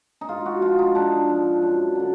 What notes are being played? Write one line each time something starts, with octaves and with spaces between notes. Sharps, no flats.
D#4
G#2 F4
F#4
F3 F4
D#4
G#2 D4
F3
F#2
D3 F#3